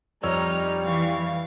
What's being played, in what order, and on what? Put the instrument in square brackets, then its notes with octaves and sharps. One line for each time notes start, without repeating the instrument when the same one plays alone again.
[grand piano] F2 C#5 E6 [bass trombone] G3 [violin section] D#4 F6
[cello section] E3 [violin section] F5 C#6